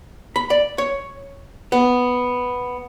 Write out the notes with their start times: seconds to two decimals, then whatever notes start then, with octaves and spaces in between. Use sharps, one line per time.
0.36 B5
0.50 D5
0.78 C#5
1.72 B3